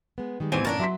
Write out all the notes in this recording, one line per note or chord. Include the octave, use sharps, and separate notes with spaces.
G#3 B3
D#3 G3 G#3
A1 E2 E3 C4 G#5
G1 A#2 E3 C#4 D4 A#4 A5
F#3 E5 C6 B6